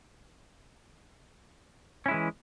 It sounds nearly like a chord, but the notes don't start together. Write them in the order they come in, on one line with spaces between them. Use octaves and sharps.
C#4 E4 G#3 E3